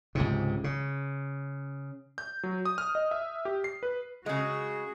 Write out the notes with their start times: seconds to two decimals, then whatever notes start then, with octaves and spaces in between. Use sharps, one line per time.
0.15 C#2 G#2 C3
0.64 C#3
2.18 G6
2.43 F#3
2.65 D#6
2.78 F6
2.95 D#5
3.11 E5
3.45 G4
3.64 C7
3.83 B4
4.26 C#3 G#3 F#4 G#4